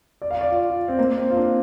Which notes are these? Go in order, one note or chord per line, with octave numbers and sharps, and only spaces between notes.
D5
F5
D5
F4
F4
C4
A#3
C4
F4
D4